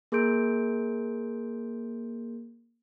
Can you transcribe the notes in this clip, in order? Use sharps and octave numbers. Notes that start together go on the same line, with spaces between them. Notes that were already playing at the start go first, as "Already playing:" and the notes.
A#3 G#4 A#4 C6 G6 D7